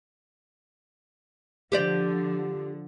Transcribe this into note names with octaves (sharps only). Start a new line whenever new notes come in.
D3 F3 G4 C5 D5